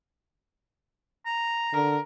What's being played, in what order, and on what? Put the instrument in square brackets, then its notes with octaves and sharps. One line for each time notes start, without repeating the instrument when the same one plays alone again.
[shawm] A#5
[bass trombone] D3 [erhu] A#4